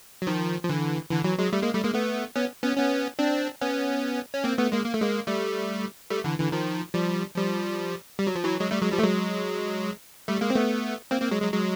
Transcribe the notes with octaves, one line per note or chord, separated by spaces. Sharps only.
F#3
D#3 F3
F3
D3 E3
D3 E3
E3 F#3
F#3 G#3
G3 A3
G#3 A#3
G3 A3
G#3 A#3
A3 B3
B3 C#4
B3 C#4
B3 C#4
C4 D4
B3 C#4
C#4
A#3 C4
A3 B3
G#3 A#3
A#3
A3
G#3 A#3
G3 A3
G3 A3
D3 E3
D3 E3
D#3 F3
F3 G3
F3 G3
G3
F#3
F3
E3 F#3
F#3 G#3
G3 A3
F#3 G#3
F3 G3
A3
F#3 G#3
G3 A3
G#3 A#3
C4
A3 B3
A#3 C4
A#3 C4
F#3 G#3
F#3 G#3
F#3 G#3